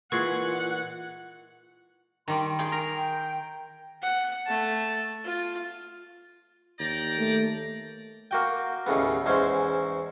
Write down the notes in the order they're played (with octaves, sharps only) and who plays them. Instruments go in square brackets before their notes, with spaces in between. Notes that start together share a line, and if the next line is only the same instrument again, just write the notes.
[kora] A#2 E3 G#3 [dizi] F4 [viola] F#5 [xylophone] C#6 G#6 C7
[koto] D#3 G3 [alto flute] C6
[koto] G#4 G5
A#4
[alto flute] G5
[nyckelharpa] F#5
A3 A5
F4
[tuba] D#2 [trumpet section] D5 G5 A#5
[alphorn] A3
[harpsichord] A#3 F#4 G5
D#2 A2 C#3 B3
E2 G#2 C#4 C5